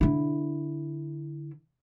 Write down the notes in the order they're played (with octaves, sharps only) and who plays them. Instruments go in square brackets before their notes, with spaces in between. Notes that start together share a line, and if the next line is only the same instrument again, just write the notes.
[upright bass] D3 E4